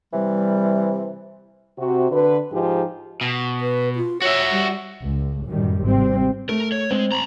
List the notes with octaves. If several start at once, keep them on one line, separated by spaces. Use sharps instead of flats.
C3 E3 G3
C3 F#4
D3 B4
G#2 F3 D#4 G4 G#4
B2
B4
F4
F#4 C#5 E5
G3
C#2
F#2 A2 D#3 G3
G#1 C3 G3 C4
A3 A#4
C#5
G#3 C4
A#5 B5